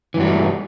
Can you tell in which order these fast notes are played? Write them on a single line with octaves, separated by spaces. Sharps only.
E3 G2 F#3 A3 G3